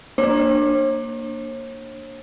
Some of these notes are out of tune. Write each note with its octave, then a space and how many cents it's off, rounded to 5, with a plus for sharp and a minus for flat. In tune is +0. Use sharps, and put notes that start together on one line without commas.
A#3 +0 D4 +15 C#5 -45